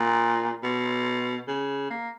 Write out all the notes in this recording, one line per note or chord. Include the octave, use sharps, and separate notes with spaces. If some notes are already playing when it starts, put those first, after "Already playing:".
Already playing: A#2
B2
C#3
A#3